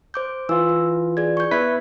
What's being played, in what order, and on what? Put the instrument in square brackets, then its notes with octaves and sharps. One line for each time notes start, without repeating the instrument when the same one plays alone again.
[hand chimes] C5 D6 G6
[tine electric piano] E3 F4 [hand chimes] E6
[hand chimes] E4
G#4 D5 G#6
C#6 G6
[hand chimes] B3 E5 G#6 [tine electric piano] E4 B4 B6